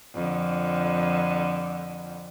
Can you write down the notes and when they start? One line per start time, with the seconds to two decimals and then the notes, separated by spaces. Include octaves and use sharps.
0.14 F2 D3